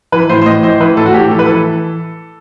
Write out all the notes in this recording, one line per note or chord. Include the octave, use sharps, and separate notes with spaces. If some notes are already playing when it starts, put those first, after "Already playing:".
E3 B4
A2 C5
C5
A2 D#5
E3 C5
E3 B4
A2 A4
F#4
A2 G4
E3 A4
B4
E3 A4